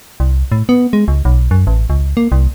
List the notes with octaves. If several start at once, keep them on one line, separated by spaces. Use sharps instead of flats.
C2
A2
B3
G#3
C#2
B1
F#2
A1
C#2
A#3
C2